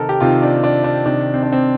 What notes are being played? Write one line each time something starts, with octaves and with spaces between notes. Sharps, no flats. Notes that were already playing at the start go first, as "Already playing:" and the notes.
Already playing: C3 D#3 A4 A#4
G4
C3 D#3 F4
D4
D4
D4
C3 D#3 D4
C4
D4
C4